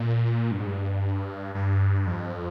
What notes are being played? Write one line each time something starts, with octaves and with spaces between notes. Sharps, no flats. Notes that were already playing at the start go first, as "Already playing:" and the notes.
Already playing: A#2
G2
G#2
G2
G2
F2